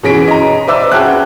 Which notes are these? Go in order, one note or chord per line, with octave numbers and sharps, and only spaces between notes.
B2 E3 C#4 G#4 B6 D7
D#5 A#5
B4 C5 D5 E5 D6 E6
C#4 F#4 G#4 G5 A5 F#6